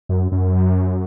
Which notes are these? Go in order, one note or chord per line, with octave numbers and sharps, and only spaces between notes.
F#2
F#2